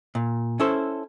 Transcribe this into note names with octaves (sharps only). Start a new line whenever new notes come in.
A#2
C#4 E4 A4 C5